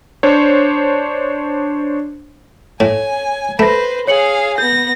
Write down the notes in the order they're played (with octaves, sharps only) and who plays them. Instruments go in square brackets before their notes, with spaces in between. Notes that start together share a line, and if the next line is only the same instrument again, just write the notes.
[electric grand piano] D4 C5 C#5
[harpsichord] A2 [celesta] C#5 [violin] G#5
[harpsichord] A3 [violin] B4 C5 [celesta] B5 A#6
[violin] G#4 F5 [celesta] C#5 C#7 F#7
[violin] B3 A#6 [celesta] G6